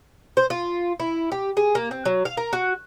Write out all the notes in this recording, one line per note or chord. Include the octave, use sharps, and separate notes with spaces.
C5
F4
E4
G4
G#4
A#3
C4
F#3
F5
A#4
F#4